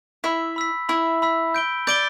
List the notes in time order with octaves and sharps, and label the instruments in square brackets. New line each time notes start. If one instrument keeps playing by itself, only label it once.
[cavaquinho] E4 E5 [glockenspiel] B5 E6 B6
[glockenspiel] B5 E6 B6
[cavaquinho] E4 E5 [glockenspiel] B5 E6 B6
[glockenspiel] B5 E6 B6
G6 D7 G7
[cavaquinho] D5 [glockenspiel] G6 D7 G7